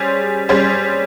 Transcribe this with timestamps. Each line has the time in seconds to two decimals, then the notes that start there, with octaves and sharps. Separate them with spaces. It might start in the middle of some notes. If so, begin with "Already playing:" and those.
Already playing: G3 C#4 G#4 C5
0.49 G3 C#4 G#4 C5